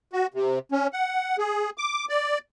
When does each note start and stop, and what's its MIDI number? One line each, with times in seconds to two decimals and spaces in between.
0.13 0.27 66
0.34 0.59 48
0.72 0.87 61
0.93 1.37 78
1.38 1.70 68
1.78 2.05 86
2.09 2.38 74